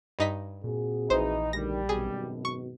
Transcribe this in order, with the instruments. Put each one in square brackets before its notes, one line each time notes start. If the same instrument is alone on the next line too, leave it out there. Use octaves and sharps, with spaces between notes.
[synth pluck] G2 D#4 B6
[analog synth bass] A#2 [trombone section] C4 F#4 G#4
[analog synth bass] A#1 [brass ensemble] E3 D#4 [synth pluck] C5
[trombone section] D2 D#3 [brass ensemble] G3 [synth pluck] A#6
[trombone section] G#1 F#2 B2 [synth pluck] G#4
[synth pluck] C#6